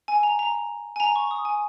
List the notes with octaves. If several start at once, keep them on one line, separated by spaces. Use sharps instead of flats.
G#5
A#5
A#5
G#5
A#5
C#6
D#6
G#5